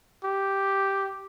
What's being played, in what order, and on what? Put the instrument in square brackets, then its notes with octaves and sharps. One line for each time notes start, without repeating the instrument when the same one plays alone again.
[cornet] G4